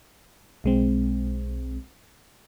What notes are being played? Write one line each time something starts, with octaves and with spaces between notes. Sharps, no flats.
B1 G#3 C4